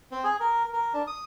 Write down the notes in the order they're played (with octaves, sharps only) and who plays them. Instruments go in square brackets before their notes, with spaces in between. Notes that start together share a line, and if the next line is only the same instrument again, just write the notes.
[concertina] C4
G#4
A#4
A#4
D4
D#6